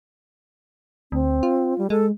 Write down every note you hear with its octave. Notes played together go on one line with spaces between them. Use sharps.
D2 C4
F4
G3
G#3 A4